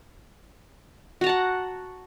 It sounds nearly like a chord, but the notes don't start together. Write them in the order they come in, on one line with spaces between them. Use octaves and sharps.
F#4 A#5 A5 F#5